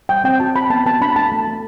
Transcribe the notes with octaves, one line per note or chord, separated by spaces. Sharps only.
G3 G5
C4 G5
F#4 A5
F#4 B5
B3 A5
B3 A5
D4 B5
A3 A5
A3
A3